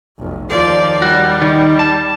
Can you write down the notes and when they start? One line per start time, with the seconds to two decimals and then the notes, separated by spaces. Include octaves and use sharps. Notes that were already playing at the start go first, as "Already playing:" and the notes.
0.18 F1 B1
0.49 D#2 F3 D5
1.02 G3 F#4
1.42 D#3
1.79 A5